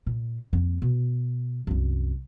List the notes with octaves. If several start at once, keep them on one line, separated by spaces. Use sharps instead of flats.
A#2
F2 A#3
B2
C2 F#2